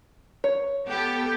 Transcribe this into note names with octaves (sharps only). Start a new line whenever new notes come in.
C#5
B3 G4 A4